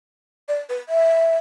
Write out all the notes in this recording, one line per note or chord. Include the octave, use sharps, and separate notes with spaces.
D5
B4
E5